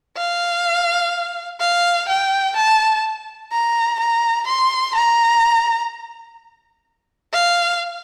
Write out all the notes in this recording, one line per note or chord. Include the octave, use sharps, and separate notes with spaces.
F5
F5
G5
A5
A#5
A#5
C6
A#5
F5